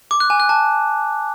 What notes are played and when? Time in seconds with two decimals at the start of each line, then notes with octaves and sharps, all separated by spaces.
0.11 D6
0.20 F#6
0.30 G#5
0.40 F#6
0.49 A5